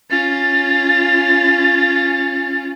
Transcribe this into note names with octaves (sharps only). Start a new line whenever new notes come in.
C#4 F4 A6